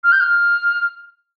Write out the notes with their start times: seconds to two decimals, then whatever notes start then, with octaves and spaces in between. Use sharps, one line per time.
0.04 F6
0.12 G6
0.20 F6